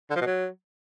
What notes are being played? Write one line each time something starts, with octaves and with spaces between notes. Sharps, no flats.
D3
F3
B2
F#3